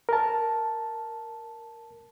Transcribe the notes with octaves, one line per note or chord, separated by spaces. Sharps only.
A#4 A5